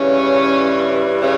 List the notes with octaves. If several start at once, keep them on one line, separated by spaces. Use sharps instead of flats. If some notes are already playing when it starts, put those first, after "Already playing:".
Already playing: G2 C#3 E3 C#4
C#3 C#4